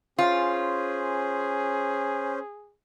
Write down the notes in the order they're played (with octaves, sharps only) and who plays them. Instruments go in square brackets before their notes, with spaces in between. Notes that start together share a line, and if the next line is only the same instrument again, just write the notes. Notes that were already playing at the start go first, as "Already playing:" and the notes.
[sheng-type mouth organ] C#4 C5 [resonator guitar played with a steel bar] F4 [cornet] G#4